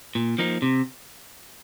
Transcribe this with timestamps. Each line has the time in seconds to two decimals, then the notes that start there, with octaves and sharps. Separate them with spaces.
0.15 A#2
0.38 F3 A#3 D#4
0.62 C3